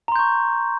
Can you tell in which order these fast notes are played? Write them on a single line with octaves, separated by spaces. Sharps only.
A#5 C6 G6 C#6